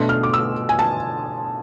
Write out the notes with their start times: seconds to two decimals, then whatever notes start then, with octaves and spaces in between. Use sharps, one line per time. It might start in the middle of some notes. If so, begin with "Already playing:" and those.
Already playing: B2 A3 D4 C6
0.09 F6
0.23 D6
0.33 E6
0.69 G#5
0.79 A5